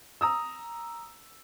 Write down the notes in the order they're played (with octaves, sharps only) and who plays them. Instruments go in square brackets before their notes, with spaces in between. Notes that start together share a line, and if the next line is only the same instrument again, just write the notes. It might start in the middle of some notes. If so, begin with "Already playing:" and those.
[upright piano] A#5 D#6 E6